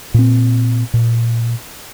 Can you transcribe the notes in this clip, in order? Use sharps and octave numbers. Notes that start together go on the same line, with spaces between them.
A#2 C4
A#2